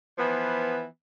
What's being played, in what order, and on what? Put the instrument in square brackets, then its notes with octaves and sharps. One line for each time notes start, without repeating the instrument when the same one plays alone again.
[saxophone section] E3 F3 B3